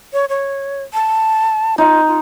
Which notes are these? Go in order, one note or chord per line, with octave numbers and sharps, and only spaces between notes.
C#5
C#5
A5
D#4 F4
F4